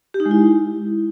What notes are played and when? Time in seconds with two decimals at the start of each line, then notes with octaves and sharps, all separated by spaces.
0.14 G4
0.20 D#4
0.26 G#3
0.31 E4